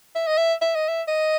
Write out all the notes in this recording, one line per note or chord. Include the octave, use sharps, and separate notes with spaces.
E5
D#5
E5
E5
D#5
E5
D#5